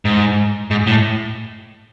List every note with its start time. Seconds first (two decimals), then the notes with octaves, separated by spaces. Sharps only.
0.05 G#2
0.71 G#2
0.87 A2